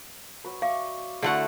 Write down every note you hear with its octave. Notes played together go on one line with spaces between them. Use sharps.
F#3 B4
D5 E5 F5 C#6
D3 A3 E4 F#4 F#5